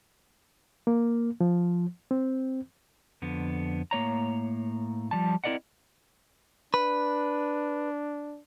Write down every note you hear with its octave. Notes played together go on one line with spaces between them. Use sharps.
A#3
F3
C4
F2 D3 B3
A2 A#3 C#5 A#5
F3 G3 A5
C4 E4 A#4 D5 D#5 F#5
D4 B4